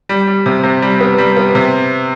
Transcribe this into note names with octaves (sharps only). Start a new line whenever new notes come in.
G3
G3
C3
C3
G3
B3
G3
B3
C3